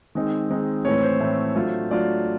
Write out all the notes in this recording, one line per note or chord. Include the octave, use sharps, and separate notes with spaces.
D#3 G#3 C4 D#4
D#3 G#3 C4 D#4
A2 E3 A3 C4 C#5
C5
A2 E3 A3 C4
F#3 A3 D4 F4
F#3 A3 D4 F4 D5